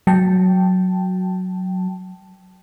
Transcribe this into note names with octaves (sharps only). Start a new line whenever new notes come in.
F#3 G5 A5